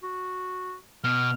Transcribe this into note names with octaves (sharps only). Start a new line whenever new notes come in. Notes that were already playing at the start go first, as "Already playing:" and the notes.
F#4
B2 F6